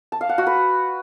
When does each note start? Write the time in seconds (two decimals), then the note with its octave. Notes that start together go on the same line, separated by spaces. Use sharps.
0.12 A5
0.21 F5
0.29 F#5
0.38 F#4
0.47 B4